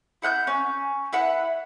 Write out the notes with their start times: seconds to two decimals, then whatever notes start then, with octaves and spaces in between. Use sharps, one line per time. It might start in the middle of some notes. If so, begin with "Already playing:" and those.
0.22 E4 F#5 F#6 G6
0.47 C#4
1.13 E4 B4 F#5